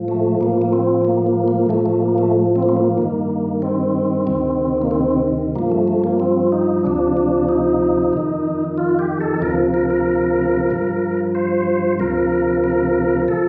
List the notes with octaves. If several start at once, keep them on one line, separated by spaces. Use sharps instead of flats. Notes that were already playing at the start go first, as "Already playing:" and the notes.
Already playing: A2 F3
A3
A2 F3 A#3
A#3
C4
A#3
A#3
A#3
A2 F3 A3
A3
A#3
A3
C4
A#3
C4
A#3
G2 D#3
C4
D2 C3 D#3
A#3
C4
G2 F3 A#3
A3
A3
A#3
C4
D#4
D2 C3 F3 D4
D4
D#4
F2 D#3
F4
G4
A4
D2 C3 F3 A#4
A#4
A#4
G2 F3
C5
D2 C3 F3 A#4
A#4
F3 A4